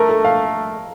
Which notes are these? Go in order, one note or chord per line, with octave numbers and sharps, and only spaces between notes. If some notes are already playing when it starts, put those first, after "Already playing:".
Already playing: A3 A#4
A4
F5